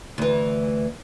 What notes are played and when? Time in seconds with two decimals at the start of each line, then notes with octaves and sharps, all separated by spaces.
0.18 D2 E3